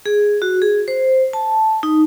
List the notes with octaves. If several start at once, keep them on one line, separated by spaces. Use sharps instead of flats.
G#4
F#4
G#4
C5
A5
D#4